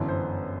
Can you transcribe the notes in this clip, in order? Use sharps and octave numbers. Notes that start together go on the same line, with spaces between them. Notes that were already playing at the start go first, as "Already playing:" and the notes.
Already playing: G1 F#2 E3
C5